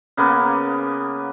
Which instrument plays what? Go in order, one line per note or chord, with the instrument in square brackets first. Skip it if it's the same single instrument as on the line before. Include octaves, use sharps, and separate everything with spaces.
[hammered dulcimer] C#3 A#3 B3